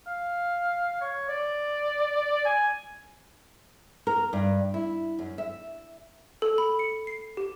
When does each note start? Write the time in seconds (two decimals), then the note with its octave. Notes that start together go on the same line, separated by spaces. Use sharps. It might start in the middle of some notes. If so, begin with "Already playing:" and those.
0.07 F5
1.01 C#5
1.29 D5
2.45 G#5
4.07 A#4
4.33 G2
4.74 E4
5.19 F#2
5.38 E5
6.42 A4
6.58 B5
6.79 C#7
7.07 C7
7.37 G4